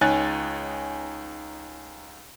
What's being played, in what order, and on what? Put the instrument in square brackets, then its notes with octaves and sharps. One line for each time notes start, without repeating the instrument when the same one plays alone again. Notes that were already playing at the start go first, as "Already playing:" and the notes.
[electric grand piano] C#2 D#4 C#5 G#5 F#6 A6